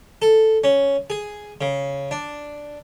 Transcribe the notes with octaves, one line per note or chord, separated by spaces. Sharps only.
A4
C#4
G#4
C#3
D4